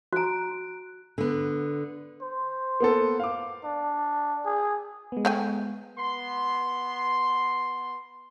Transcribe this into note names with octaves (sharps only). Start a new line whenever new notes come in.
F#4 A#5 F#6 D7
D3 B3
C5
A#3 B3 A4
F5 D6
D4
G#4
G#3 B3
A3 G5 G#5
B3 C6